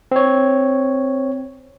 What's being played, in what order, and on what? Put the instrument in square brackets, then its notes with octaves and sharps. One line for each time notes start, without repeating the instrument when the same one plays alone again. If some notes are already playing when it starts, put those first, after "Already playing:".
[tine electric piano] C4 C#5